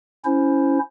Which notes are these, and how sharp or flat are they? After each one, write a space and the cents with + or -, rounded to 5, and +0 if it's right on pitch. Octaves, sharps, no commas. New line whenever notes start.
C#4 +5 E4 +0 C5 +0